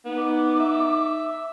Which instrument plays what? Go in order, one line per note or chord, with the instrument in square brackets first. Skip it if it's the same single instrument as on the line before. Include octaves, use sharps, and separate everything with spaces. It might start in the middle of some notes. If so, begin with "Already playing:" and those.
[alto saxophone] B3 [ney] D#4
[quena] D6
[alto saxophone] E5